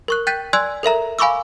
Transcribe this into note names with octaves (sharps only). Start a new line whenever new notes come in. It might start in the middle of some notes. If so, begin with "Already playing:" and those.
A#4 C#6 F#6
G5 F#6 G6 A6 B6 D#7
D5 G#5 C6 E6 F#6 G#6
A4 A#4 E5 A#5
F5 G#5 B5 C#6 D6 E6